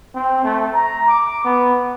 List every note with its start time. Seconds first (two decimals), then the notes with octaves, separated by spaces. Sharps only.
0.15 C4
0.44 A3
0.75 A#5
1.09 D6
1.44 B3